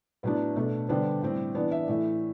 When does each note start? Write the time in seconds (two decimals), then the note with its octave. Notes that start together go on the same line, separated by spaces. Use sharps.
0.23 A2 F#3 B3 D4 B4
0.56 B2 A3 D4
0.89 D3 G3 B3 D4 C5
1.23 A2 G3 C4
1.55 E3 B3 D4 D5
1.71 E5
1.88 A2 E3 A3 E5